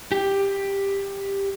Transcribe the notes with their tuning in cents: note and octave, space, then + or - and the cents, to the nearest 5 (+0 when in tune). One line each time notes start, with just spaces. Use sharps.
G4 +10